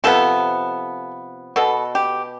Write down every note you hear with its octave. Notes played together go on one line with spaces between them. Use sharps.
C3 F3 B3 A4
B2 B3 A4
G4